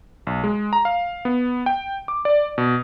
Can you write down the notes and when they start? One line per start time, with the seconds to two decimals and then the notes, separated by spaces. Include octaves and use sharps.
0.27 B1
0.44 G#3
0.73 A#5
0.85 F5
1.25 B3
1.66 G5
2.08 D6
2.25 D5
2.58 B2